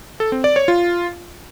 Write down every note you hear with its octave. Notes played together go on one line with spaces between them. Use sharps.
A4
C4
D5
C#5
F4